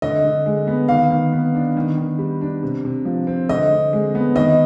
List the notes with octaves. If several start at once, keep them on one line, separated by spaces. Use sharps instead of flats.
D3 D#5
D3
G#3
B3
D#3 F5
D#3
B3
D4
D#3
D#3
G3
D4
C3
C3
F3
C4
D3 D#5
D3
G#3
B3
D#3 D#5